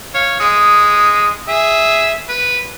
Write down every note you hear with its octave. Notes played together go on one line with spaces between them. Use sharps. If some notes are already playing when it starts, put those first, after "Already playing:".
C#5 F5
G#3 D#6
G#4 E5
B4